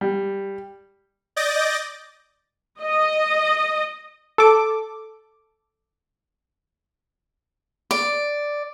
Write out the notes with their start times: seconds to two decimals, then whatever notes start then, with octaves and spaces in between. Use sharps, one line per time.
0.01 G3
1.36 D5 D#5 D6 G6 A6 A#6
2.81 D#5
4.38 A4 D6
7.91 D5